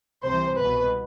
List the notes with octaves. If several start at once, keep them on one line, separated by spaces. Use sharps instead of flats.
C2 C3 E3 C5
C2 B2 B4